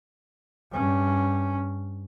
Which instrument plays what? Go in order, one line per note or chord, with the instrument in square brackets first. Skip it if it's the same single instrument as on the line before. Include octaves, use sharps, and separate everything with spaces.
[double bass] G2 C#4